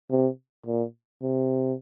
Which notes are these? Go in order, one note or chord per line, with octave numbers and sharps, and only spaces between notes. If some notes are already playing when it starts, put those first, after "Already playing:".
C3
A#2
C3